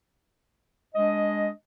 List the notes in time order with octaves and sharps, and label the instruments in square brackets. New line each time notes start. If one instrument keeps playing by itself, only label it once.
[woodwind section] G#3 D4 D#5